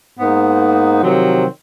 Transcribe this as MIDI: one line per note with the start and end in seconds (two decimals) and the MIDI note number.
0.20 1.02 44
0.20 1.02 58
0.20 1.02 59
0.20 1.02 63
0.20 1.02 72
1.04 1.45 48
1.04 1.45 51
1.04 1.45 53
1.04 1.45 54
1.04 1.45 60